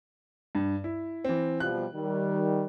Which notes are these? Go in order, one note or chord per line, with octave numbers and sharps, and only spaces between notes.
G2
E4
E3 C4
B2 F3 G3 F#6
D#3 G3